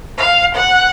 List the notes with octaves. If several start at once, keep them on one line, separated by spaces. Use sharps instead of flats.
F5
F#5